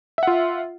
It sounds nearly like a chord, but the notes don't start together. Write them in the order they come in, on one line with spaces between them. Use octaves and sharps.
E5 F#5 F4